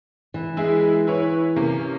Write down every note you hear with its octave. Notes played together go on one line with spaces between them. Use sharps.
E3
G#3 E4 G#4
E4 B4 C#5
C3 A#3 C#4